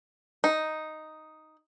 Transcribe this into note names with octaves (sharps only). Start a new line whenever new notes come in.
D#4